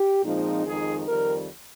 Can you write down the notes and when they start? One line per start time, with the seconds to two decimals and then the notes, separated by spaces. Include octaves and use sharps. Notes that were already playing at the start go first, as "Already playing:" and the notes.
Already playing: G4
0.23 A#2 F3 G#3 C4 D#4
0.65 F2 D#3 G#3 D#4 G#4
1.06 F2 D#3 G3 A#4